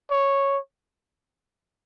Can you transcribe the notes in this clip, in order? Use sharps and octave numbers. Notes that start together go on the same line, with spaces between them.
C#5